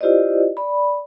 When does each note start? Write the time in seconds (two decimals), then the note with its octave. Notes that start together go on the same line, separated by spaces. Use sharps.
0.01 E4 F4 G4 C5 D5 D#5
0.57 D5 B5